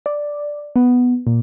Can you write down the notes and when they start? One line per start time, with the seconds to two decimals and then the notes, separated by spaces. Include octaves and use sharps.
0.06 D5
0.76 B3
1.27 A#2